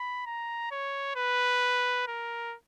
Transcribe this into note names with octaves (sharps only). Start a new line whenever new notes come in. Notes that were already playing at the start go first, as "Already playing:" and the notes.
Already playing: B5
A#5
C#5
B4
A#4